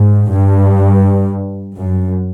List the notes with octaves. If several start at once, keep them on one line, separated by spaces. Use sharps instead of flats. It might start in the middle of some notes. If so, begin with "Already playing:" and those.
Already playing: G#2
G2
F#2